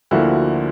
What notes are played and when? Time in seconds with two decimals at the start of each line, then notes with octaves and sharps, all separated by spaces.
0.11 D2 D3 F3 A#3 E4 F#4